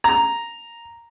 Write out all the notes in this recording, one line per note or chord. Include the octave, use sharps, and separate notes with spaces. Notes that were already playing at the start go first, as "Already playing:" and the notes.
A#5